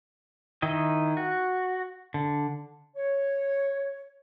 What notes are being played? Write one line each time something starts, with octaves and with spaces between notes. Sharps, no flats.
D#3 E4 D#5
F#4
D3
C#5